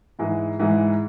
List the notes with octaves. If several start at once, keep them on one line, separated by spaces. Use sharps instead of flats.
G#2 E3 G#3
G#2 E3 G#3